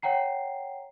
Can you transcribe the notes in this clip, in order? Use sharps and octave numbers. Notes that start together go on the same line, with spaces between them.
C#5 F#5 G5 A#5 C7